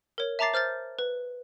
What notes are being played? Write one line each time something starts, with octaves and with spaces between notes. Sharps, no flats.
A#4 C#5
E5 A5 A#5 D6 A6 C7
C5 F6 G6 A6
B4